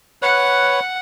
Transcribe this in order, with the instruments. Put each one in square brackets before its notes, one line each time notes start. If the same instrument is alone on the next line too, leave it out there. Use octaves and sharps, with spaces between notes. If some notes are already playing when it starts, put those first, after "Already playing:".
[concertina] B4 C#5 [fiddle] F#5